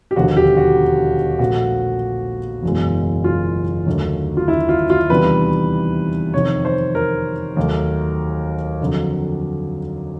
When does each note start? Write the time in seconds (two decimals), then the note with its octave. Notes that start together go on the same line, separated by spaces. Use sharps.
0.11 G4
0.16 E1 D#2 D3 F3 F#4
0.37 G4
0.57 F#4
1.39 A#1 A#2 F3 A3 F#4
2.63 F#1 E2 B2 G#3
3.24 F4
3.86 D#2 D3 F#3 A3
4.37 F4
4.48 E4
4.69 F4
4.90 F4
5.10 E2 C3 D#3 G3 B4
6.33 F2 C3 D#3 C#5
6.65 C5
6.95 A#4
7.57 D#2 D#3 F#3 A3
8.81 F2 D3 F#3